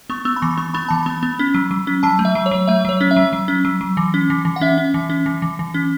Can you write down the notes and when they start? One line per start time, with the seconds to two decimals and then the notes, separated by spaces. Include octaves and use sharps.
0.10 B3 C#6
0.25 B3 E6
0.36 B5
0.42 E3 C#6
0.58 B3 C#6
0.74 B3 B5
0.88 E3 A5
1.03 B3 B5
1.23 B3
1.39 C#4
1.54 F#3
1.71 F#3
1.87 C#4
2.03 F#3 A5
2.19 A3
2.25 E5
2.35 F#3
2.46 C#5
2.51 F#3
2.67 A3 E5
2.85 F#3 C#5
3.01 C#4
3.11 E5
3.16 F#3
3.33 F#3
3.48 C#4
3.65 F#3
3.81 F#3
3.97 E3
4.14 C#4
4.30 E3
4.45 E3
4.56 F#5
4.61 C#4 E5
4.78 C#4
4.94 E3
5.10 C#4
5.26 E3
5.42 E3
5.59 E3
5.74 C#4